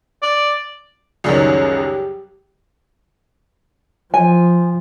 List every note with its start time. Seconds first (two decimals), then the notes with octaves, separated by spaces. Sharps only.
0.22 D5
1.24 C#2 F#2 D#3 F#3 G3
1.73 G4
4.14 F3 G#5